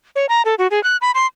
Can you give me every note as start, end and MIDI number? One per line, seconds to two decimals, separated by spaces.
0.16 0.26 73
0.29 0.42 82
0.45 0.55 69
0.59 0.67 66
0.71 0.82 68
0.84 0.97 90
1.02 1.11 83
1.15 1.26 84